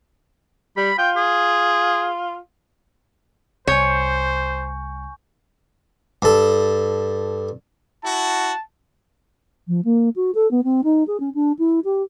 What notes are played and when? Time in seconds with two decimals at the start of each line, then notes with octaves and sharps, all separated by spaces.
0.77 G3 B5
0.98 F4 G5
1.16 G#4
3.67 C2 C5 C#5 G#5 C#6 G6
6.22 G2 A4
8.05 E4 F#4 A5
9.68 F3
9.85 A#3
10.16 F#4
10.35 A4
10.51 B3
10.64 C4
10.84 D#4
11.08 G#4
11.20 C#4
11.35 D4
11.59 E4
11.85 G4